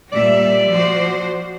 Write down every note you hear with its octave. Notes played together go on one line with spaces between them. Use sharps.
A#2 G3 D5 E5
F3 F#4 C5